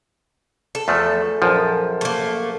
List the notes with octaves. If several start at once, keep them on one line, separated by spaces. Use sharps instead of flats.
A4
E2 F3 A3
A#1 F#2 F3
A3 A#3